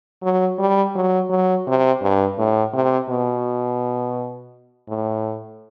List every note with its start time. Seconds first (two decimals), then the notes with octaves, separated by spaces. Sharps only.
0.22 F#3
0.59 G3
0.95 F#3
1.30 F#3
1.67 C3
2.02 G2
2.39 A2
2.73 C3
3.09 B2
4.89 A2